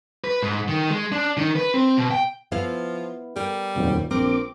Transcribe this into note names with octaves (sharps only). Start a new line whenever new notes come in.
B4
G#2
D#3
G#3
D4
D#3
B4
C4
B2
G5
F3 B3 E4 F5
G3 A#4
D#1 F2 C3 F#3
A#1 C4 A#4 D6